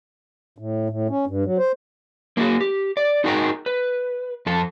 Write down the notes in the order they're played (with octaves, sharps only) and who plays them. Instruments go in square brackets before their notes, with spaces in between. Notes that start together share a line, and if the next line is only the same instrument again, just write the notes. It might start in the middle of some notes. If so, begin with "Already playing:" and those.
[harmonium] A2
A2
C#4
G2
F#3
C5
[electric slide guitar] A#3 D#4 E4 F#4 G#4
G4
D5
D#4 F#4 G#4 A#4 G5 A#5
B4
F2 A4 A5